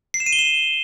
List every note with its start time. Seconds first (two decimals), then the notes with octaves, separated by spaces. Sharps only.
0.14 C7
0.20 E7
0.26 D#7
0.33 G7
0.39 E7